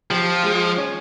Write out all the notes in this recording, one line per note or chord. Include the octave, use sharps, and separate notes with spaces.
F3 G4
G#3
C#4